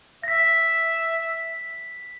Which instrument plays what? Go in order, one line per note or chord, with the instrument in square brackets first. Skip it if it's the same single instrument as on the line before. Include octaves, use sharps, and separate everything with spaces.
[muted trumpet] E5 [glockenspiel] A#6 B6